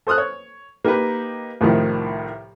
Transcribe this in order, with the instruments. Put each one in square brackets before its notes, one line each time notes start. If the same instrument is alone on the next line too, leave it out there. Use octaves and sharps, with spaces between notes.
[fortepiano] A4 C5 D#6 F6 F#6
C#5
A#3 D#4 G4 A#4 B4
C2 A2 D#3 F3